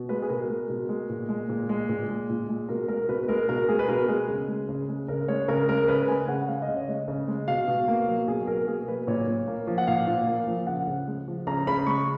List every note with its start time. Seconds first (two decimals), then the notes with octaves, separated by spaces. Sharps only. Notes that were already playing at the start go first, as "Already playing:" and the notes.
Already playing: B2
0.09 G#3 B4
0.22 G#4
0.29 B2 A#4
0.49 G#3
0.69 B2
0.89 G#3
1.09 A#2
1.29 G#3
1.49 A#2
1.69 G#3
1.89 A#2
2.09 G#3
2.30 A#2
2.49 G#3
2.69 B2 A#4
2.88 G#3 A#4
3.09 B2 B4
3.28 G#3 A#4
3.49 B2 A#4
3.69 G#3 G#4
3.79 B4
3.88 B2 A#4
4.08 G#3 G#4
4.28 C#3
4.48 G#3
4.69 C#3
4.88 G#3
5.08 C#3 A#4
5.28 G#3 C#5
5.48 C#3 A#4
5.69 G#3 A#4
5.88 C#3 B4
6.08 G#3 G#5
6.28 C#3 F#5
6.48 G#3 F5
6.62 D#5
6.68 C#3
6.76 C#5
6.88 G#3 D#5
7.08 C#3
7.28 G#3
7.48 B2 F5
7.68 B2
7.88 A#3
8.08 F#3
8.27 B2 G#4
8.47 B2 A#4
8.67 A#3 G#4
8.88 F#3 B4
9.07 A#2 C#5
9.28 A#2
9.48 A#3
9.67 F3
9.78 F#5
9.87 A#2 F5
10.07 A#2
10.27 A#3
10.47 F3
10.67 C#3 F#5
10.87 C#3
11.07 G#3
11.28 F3
11.47 C#3 A#5
11.67 C#3 B5
11.87 G#3 C#6